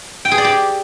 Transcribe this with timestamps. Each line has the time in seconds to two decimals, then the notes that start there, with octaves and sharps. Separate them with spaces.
0.25 G5
0.31 G#4
0.38 D5
0.44 G4